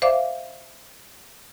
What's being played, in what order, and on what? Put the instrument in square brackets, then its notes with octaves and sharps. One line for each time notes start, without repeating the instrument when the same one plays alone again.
[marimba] C5 D5 E5 F5 D6